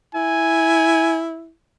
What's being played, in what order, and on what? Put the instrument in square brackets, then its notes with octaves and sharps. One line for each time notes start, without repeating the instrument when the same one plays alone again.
[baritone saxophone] E4 [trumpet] G#5